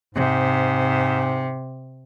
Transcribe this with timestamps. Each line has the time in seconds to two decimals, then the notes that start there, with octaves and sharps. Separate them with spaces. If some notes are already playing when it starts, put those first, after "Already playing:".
0.14 G#2 C3